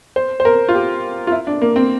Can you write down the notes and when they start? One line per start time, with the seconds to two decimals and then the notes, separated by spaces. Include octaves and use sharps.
0.16 C5
0.40 C5
0.45 A#4
0.69 F4
0.74 G4
1.27 F4
1.32 E4
1.47 D4
1.62 A#3
1.76 C4